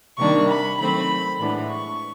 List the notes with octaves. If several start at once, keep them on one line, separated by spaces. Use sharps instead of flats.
C3 D#3 G3 A#3 D4 C#6
B5
D#3 F#3 A3 C4 B5
A2 E3 G#3 B3 D4
C#6